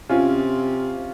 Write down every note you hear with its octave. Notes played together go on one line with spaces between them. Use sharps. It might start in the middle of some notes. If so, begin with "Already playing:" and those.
C3 C#4 F4